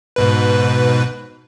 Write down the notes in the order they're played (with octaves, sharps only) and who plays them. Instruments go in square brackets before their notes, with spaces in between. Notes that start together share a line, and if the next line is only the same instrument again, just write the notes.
[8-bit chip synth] G#2 B2 B4